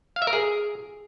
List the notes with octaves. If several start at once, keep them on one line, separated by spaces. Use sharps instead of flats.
F5
E5
A#4
G#4